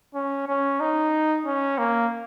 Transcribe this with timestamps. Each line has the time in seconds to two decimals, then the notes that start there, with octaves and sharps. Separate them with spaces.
0.15 C#4
0.48 C#4
0.80 D#4
1.46 C#4
1.78 A#3